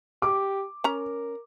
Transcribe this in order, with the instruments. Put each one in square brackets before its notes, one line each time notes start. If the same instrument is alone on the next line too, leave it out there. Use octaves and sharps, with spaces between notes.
[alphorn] G4 [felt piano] D6
[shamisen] C#4 A#5 [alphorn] A#4